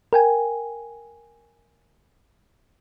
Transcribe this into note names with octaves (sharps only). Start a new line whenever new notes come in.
A#4 G5 G#5